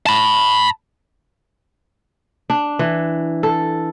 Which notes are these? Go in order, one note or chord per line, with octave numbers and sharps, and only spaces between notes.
A5 B5
D4
E3
A4